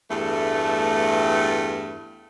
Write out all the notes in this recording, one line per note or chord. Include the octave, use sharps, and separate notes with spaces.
E2 G2 A3